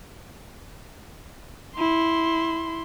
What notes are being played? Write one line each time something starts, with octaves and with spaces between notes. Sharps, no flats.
E4 C6